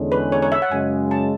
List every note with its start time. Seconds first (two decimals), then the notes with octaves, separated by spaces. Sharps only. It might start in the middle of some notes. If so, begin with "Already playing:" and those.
Already playing: E2 D3 G#3 C#4 G#4
0.12 B4
0.32 C#5
0.42 C#5
0.52 E5
0.62 F#5
0.71 F#2 C#3 G#3 G#5
1.11 A5